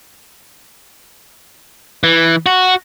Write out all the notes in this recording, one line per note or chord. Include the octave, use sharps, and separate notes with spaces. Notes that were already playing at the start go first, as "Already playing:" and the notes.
E3
F#4